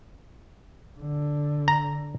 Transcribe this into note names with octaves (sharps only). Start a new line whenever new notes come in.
D3
A#5